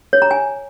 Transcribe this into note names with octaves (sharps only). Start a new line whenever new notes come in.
C#5
A#5
G#5